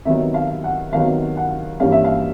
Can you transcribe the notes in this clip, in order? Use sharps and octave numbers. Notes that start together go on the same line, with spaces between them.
C3 D#3 F#3 B3 E5
F5
F#5
C3 D#3 F#3 B3 F5
F#5
G2 E3 G3 A#3 C#4 F5
E5
F5